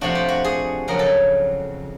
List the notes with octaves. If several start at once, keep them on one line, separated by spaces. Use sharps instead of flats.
C3 F3 A3 D4 F#4
G4
F#4
G#4
F2 C#3 F#3 A#4
A4